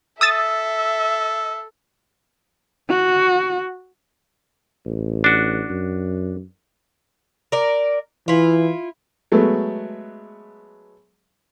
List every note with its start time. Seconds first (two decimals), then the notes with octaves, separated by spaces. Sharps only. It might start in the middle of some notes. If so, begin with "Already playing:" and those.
0.21 A4 E5 D#6 E6 A6
2.90 F#4
4.86 A1
5.24 D4 F#4
5.70 F#2
7.52 A#4 D5
8.28 E3 E4 F4
9.32 F#3 G#3 A3 B3